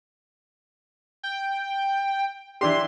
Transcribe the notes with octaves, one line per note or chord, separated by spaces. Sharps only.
G5
E3 D4 G4 C6